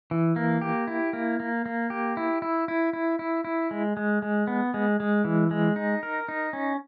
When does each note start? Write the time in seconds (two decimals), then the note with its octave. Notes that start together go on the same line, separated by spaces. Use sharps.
0.11 E3
0.36 A#3
0.61 G4
0.88 E4
1.13 A#3
1.40 A#3
1.66 A#3
1.90 G4
2.17 E4
2.42 E4
2.68 E4
2.93 E4
3.19 E4
3.44 E4
3.71 G#3
3.97 G#3
4.22 G#3
4.47 B3
4.74 G#3
5.00 G#3
5.25 E3
5.51 G#3
5.76 D#4
6.03 A#4
6.28 D#4
6.53 C#4